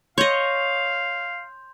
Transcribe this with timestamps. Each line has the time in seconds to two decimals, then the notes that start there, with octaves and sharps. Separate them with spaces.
0.18 C#5 D#5 F5 C6 G6 F7